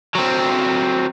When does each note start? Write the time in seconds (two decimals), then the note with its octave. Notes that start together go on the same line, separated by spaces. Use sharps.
0.15 F#3 C4